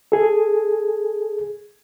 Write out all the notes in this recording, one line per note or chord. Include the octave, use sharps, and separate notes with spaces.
G#4 A4